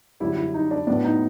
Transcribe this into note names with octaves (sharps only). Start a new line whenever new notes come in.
F#2 D3 G3 E4
E4
D#4
D4
A2 F#3 B3 D4
D#4